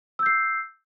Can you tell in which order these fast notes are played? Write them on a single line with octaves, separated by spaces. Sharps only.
E6 G6 C7